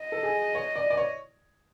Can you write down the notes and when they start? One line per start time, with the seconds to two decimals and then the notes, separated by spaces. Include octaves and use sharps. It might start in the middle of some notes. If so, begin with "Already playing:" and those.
Already playing: D#5
0.12 A4
0.23 G#4
0.55 C#5
0.76 D5
0.90 D5
0.97 C#5